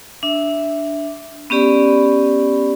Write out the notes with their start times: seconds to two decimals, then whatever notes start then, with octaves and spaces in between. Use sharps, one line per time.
0.23 D4 E5
1.50 B3 C#4 G4 D5 B5